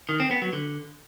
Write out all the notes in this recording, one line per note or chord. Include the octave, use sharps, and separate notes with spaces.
D#3
C4
B3
F#3
D3